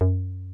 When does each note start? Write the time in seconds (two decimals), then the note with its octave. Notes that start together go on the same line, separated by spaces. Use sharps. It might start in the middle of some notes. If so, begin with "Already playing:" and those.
0.01 F#2